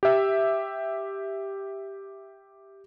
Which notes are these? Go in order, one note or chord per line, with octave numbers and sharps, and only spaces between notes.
G4 E5